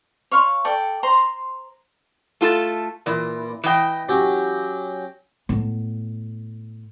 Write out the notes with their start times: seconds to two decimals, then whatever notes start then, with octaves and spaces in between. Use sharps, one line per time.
0.32 C#5 F5 C6
0.65 A4 D5 G5
1.03 C5 A#5 C6
2.41 A3 F4 A4
3.06 A#2 E3
3.64 E3 D#5 G5 B5
4.09 F#3 C#4 G4
5.49 A2 B3